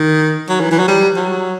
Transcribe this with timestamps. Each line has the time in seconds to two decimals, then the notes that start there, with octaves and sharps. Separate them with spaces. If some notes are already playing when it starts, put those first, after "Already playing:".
Already playing: D#3
0.49 F#3
0.60 E3
0.71 E3
0.79 F#3
0.88 G3
1.17 F#3